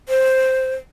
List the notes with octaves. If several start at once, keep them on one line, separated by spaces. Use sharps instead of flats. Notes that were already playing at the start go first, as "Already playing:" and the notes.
C5